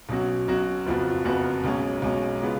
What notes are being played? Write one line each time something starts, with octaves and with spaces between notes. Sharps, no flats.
B1 B2 F#3 C#4 F#4
B1 B2 F#3 C#4 F#4
F#1 F2 F3 B3 F#4
F#1 F2 F3 B3 F#4
B1 B2 G#3 C#4
B1 B2 G#3 C#4
C#3 G#3 B3 F4